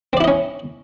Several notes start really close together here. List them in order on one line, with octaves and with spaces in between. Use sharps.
C4 D5 E4 D#5 C#4